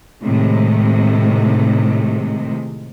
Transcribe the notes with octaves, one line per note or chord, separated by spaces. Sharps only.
A2 C3 D#3 G#3